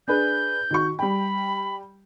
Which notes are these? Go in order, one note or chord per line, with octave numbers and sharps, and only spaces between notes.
D4 G#4 B4 G6
D#3 F#4 C#6
G3 G5 B5